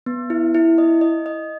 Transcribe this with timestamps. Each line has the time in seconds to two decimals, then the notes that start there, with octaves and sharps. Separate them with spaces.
0.06 B3
0.30 E4
0.54 E4
0.78 D#5
1.01 D#5
1.26 D#5